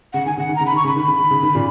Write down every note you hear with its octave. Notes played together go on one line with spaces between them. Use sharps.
C#3 F#5
D#3 G#5
C#3 F#5
D#3
A#5
C#3
B5
D#3 C#6
C#3 B5
D#3 B5
C#3
D#3
C#3
D#3
A#2 C#3